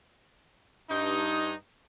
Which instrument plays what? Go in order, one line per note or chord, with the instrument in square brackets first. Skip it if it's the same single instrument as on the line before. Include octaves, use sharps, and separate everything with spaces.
[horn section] G2 D#4